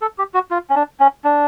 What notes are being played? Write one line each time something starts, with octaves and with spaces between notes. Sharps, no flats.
A4
G4
F#4
F4
C#4
D4
C#4
D4